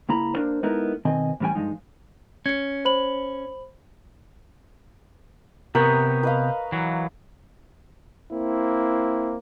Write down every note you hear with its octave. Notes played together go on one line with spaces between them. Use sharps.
C#2 A#3 E4 A#5 B5
A#3 D4 A#4 C5
G#3 B3 D#4 E4 A4 A#4
B2 D#3 C4 D#5 G#5
A2 E3 G3 C#4 G5 G#5
G2 F3 G#3 D#4
C#4 G#6 C#7
C5 B5 F#7
C3 B3 G4 A#4 C#6 D#6
B4 D#5 F5
E3 F#3
A#3 C4 E4